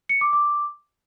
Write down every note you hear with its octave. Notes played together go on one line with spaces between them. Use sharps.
C#7
D6
D6